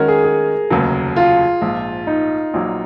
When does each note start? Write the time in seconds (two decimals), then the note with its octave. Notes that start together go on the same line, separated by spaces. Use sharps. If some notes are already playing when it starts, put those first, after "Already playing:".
Already playing: D#3 G#3 C#4 F#4 A#4
0.08 G#4
0.24 G#4
0.70 F1 D#2 C#3 F#3
1.16 F4
1.61 A#1 G#2 F3
2.07 D#4
2.54 A#1 A#2 F#3